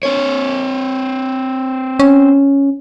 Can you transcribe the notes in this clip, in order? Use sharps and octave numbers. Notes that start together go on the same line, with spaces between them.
C4 C#5
C#4